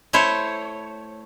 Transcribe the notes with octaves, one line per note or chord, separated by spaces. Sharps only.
A3 E4 C5 C#5